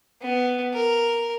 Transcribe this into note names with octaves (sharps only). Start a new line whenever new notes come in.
B3
A#4